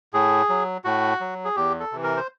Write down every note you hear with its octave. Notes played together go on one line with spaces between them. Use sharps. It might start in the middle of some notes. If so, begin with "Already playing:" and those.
A2 G#4
F#3
A2 F#4
F#3
G#4
E2 G4
A4
C3 E3
A#4
C5